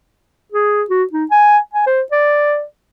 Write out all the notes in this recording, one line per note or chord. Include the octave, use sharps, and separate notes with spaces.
G#4
F#4
D#4
G#5
G#5
C5
D5